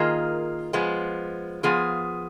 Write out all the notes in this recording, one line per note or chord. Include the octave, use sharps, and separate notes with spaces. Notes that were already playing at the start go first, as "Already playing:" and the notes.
Already playing: D#3 A#3 F4 G#4 D#5
F3 G#3 B3
F3 B3 F4 G#4